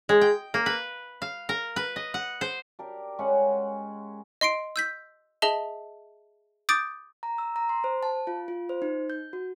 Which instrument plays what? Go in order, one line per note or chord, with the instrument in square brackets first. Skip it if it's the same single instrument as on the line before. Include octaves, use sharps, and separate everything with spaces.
[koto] G#3
G5
A#3
B4
F5
A#4
B4
D#5
F#5
C5
[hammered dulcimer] D4 G4 A#4
G#3 C#4 F#5 G#5
[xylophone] D#5 C6 C7 D7
E6 G6 B6
G#4 D#5 E5 A5 F7 G7
D6 D#6 G6 A6 D7
[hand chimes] A#5
E6
A#5
C6
C5
A5
F4
F4
C5
D#4
G6
F#4